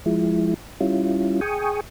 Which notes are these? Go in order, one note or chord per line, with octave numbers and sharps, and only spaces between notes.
F3 G#3 E4
G3 C#4 E4 F4
G#4 G5 G#5 C#6 D#6